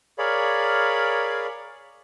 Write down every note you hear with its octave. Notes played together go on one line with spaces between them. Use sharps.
G#4 A#4 C#5 D5 F5 B5